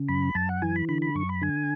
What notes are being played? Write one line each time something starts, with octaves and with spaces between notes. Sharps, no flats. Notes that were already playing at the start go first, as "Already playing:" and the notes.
Already playing: C#3
F#2 B5
F#2 A5
F#5
E3 G#5
B5
D3 B5
B5
F#2 C#6
B5
D3 G#5